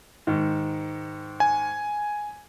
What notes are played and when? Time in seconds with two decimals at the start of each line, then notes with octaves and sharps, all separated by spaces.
0.27 G#2 D#3
1.40 G#5